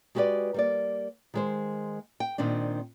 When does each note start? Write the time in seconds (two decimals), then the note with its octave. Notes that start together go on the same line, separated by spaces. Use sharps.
0.15 G#3 F#4 G4 A4 B4 D5
0.54 G3 A#3 D5
1.34 D#3 G#3 C5
2.20 G5
2.38 A#2 D#3 C4 D4